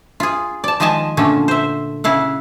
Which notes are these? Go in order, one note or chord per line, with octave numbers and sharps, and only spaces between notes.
F4 G#4
D5 A5
D#3 F3 G#3 D#5 G#5 A5
A#2 D3 F3 A3 C#4
C5 E5
C#3 E4 F5 F#5